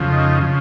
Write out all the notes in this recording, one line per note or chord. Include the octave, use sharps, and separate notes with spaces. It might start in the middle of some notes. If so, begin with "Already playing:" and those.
Already playing: F2 C#3 F3
D#4
C#3 F3